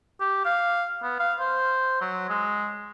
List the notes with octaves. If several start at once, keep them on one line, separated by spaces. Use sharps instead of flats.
G4
F5
B3
F5
C5
F#3
G#3